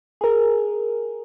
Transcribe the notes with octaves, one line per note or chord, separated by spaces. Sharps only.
G#4 A#4